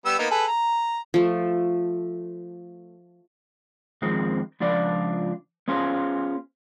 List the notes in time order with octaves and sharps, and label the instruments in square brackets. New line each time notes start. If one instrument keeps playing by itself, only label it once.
[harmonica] G3 B3 E6
A#3 B3 D#4
G#4 A4 B4
A#5
[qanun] F3 A3
[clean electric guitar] F2 D#3 F3 G#3 C4
C#2 F3 D4 F4 D5
B3 C#4 F4 G#4 C5